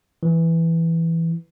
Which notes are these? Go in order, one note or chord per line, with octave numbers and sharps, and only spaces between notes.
E3